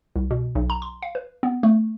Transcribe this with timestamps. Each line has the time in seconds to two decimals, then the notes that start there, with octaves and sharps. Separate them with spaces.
0.16 C2
0.31 B2
0.55 B1
0.70 A#5
0.82 C6
1.02 F5
1.15 B4
1.43 B3
1.63 A3